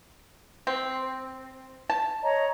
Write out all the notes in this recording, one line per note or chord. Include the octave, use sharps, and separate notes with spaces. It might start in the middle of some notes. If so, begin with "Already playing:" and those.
C4
A5
C#5 D#5 A#5